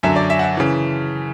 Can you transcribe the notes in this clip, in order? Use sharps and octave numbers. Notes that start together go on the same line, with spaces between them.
F#2 D3 F#3 E5
D5
E5
F#5
E5
C#3 E3